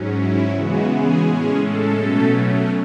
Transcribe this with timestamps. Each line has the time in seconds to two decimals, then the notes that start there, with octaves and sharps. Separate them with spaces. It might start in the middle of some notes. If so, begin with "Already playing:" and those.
Already playing: G#2 F#3 C#4
0.16 E4
0.52 C#3 E3 G#3 B3 F#4
0.89 G#4
1.26 A2 G#3 C#4
1.61 A4
1.97 B2 F#3 A3 C#4